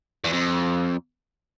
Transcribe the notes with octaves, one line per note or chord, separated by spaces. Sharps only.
E2
F2